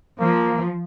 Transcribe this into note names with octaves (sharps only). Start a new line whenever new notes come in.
F3 A#3